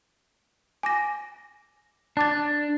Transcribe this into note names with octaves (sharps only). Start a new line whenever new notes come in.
G#5 D6 A#6
D4 A5 D6 A6